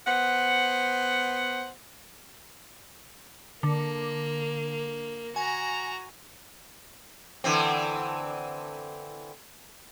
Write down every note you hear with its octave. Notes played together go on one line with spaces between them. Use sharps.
B3 C5 F#5
D3 A#3
F#4 G#5 A#5
D3 E3 C4